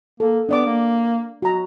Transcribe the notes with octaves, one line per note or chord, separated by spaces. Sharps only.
A#3 A4
B3 D4 D5 D6
A#3
F#3 F#4 A#5